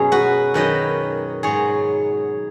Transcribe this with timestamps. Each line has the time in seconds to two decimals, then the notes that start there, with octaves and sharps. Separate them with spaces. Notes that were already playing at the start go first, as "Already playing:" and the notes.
Already playing: F#2 B2 F#3 G#4 C#5
0.12 F#4 B4
0.54 F#2 D#3 F#3 B4 D#5
1.43 G#2 F#3 G#4 C#5